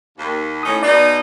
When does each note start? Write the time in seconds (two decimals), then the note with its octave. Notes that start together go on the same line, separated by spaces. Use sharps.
0.16 D#2
0.63 A2 C#4 D#4 D#6
0.83 B2 D#4 D5